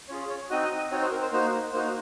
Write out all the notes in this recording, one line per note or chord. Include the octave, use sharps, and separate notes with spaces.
C#4 F4 G#4 C#5
C#5
C4 D#4 F#4 D#5
D#5
D#5
C4 D#4 F#4 C#5
C5
A#4
C5
A#3 D#4 F#4 C5
A#3 D#4 F#4 C5